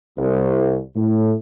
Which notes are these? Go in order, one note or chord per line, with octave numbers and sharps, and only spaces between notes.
C2
A2